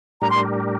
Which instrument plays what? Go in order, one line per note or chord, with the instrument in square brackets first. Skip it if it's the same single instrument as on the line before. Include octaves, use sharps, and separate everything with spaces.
[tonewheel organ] A2 G3 D4 G4 A#4 [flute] A#5
[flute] C6